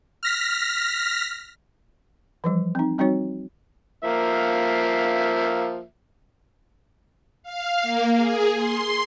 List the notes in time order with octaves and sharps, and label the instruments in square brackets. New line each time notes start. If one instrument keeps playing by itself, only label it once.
[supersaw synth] F6 A#6 B6
[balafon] E3 F3 G3
C4 D#4
G3 C4 D#4 F#4 C#5
[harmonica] F3 A#3 E5
[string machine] F5
A#3
G#4
C6